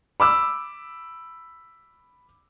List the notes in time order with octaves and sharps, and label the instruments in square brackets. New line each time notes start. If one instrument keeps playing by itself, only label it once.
[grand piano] B5 D6 E6